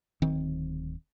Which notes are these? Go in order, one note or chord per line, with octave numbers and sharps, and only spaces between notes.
D1 D#3 C4